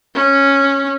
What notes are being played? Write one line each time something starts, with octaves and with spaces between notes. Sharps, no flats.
C#4